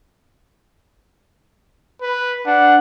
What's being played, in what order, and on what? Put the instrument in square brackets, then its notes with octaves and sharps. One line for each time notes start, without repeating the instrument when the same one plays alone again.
[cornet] B4
[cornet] D4 [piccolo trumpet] F#5